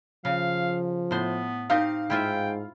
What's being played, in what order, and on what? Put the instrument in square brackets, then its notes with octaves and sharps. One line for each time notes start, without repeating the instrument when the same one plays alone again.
[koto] C#3 [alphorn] F3 [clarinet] F5
[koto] A2 C5 [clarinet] B3
[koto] C4 D#4 G4 [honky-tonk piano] F5
[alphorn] G#2 [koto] E4 F4 E5 [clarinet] G5